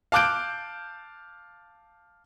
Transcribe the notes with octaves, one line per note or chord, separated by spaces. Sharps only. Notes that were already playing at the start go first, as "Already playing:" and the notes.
F5 A5 D6 F#6 G6 D7